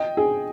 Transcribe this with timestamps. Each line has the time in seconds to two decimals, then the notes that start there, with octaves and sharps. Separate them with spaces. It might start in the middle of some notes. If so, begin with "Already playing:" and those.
Already playing: D#5 G5
0.17 G#4